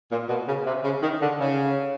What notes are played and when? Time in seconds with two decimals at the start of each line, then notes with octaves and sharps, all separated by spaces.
0.11 A#2
0.29 B2
0.48 C#3
0.66 C3
0.84 C#3
1.03 D#3
1.21 D3
1.39 C#3